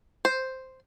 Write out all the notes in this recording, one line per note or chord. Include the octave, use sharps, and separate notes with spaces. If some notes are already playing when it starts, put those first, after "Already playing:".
C5